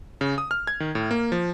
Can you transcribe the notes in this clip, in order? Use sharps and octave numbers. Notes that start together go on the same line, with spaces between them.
C#3
D#6
F6
G#6
D#3
A2
A#3
F3